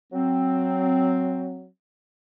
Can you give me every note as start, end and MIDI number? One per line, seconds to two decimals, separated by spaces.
0.12 1.67 54
0.12 1.67 60